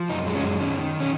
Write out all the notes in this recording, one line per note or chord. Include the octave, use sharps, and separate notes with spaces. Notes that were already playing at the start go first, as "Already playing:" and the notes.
Already playing: F3
F#2 D#4
G#3
C#4
F#2
D#3 C#4
D#3
C#4